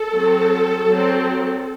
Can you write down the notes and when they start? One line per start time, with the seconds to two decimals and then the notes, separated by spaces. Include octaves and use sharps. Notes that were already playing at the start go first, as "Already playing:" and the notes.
Already playing: A4
0.13 F#3 C4
0.86 F#3 C4